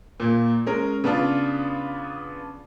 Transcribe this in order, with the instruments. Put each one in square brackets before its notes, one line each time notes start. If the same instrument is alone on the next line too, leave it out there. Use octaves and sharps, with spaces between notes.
[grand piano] A#2 A#3
G#3 C#4 A#4
C#3 B3 D4 F4